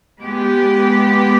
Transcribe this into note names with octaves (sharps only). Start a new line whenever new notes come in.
G#3 B3 G4